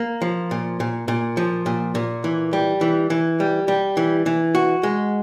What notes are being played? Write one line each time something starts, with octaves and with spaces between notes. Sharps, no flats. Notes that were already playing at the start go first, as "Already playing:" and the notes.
Already playing: A#3
F3
A#2
A#2
A#2
F3
A#2
A#2
E3
G3
E3
E3
G3
G3
E3
E3
F#4
G#3